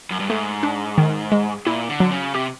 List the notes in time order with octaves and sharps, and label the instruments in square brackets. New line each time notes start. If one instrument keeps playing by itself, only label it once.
[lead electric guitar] F#2
G2
[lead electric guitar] G#2 [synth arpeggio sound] A3
[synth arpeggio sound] D4
D#3
G#3
[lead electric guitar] A#2 [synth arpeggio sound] E4
[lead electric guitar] D3
[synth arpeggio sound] F#3
[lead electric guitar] C#3
[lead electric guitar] C3 [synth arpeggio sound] G4